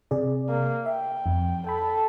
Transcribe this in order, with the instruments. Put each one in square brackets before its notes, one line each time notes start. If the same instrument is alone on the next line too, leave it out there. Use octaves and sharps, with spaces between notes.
[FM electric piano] C3 G#4 D5
[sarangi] A#3
[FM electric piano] E5 [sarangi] G5
[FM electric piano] F2
[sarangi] A4 [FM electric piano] G5 B5